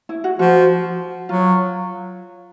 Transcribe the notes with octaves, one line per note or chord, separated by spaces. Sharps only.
E4
F#4
F3 F#4
F#3 F4